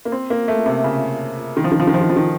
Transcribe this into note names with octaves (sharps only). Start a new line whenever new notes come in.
A#3
C4
A#3
A3
C3
C#3
D#3
F3
D#3
F3
D#3
F3
D#3
F3
D#3